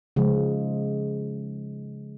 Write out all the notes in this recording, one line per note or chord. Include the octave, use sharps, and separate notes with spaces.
C#3 F3 G#3